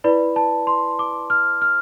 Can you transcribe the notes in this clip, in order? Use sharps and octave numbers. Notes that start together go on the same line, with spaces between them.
E4 B4 D5 B5
A5
C6
D6
F6
F6